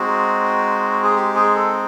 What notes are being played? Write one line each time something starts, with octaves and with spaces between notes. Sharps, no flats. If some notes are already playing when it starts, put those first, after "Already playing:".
Already playing: G#3 C4 D#4 F#4
G#4
G4
G#4
A4